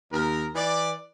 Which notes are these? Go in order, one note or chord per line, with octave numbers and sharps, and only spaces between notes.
D#2 A#4
E3 B4 D5